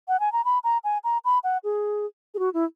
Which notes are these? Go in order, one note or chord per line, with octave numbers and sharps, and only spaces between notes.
F#5
G#5
A#5
B5
A#5
G#5
A#5
B5
F#5
G#4
G#4
F#4
E4